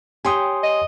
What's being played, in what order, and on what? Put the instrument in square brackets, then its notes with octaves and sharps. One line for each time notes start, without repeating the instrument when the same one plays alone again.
[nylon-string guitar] G4 C#5 G5 [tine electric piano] G#5 C6 D#6
[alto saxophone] D#5